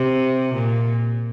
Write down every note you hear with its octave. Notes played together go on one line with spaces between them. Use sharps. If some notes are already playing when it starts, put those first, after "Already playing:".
Already playing: C3
A#2